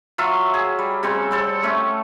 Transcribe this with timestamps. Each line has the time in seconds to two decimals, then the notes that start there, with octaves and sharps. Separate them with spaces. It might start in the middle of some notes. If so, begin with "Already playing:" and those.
0.18 F#3 F4 E5
0.54 G#4
0.79 G3
1.03 C#3 G3 C4
1.31 G3 C4 A4
1.63 A3 C#4